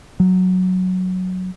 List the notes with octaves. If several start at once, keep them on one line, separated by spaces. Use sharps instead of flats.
F#3